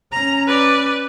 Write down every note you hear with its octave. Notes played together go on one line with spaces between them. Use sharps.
C#4 A#5
B4 D5